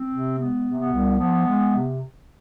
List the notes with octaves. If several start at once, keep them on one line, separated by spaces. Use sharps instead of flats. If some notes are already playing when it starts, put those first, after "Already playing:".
Already playing: C4
C3
G#3 B3
C3
B3
C2
F3 B3
G#3
C3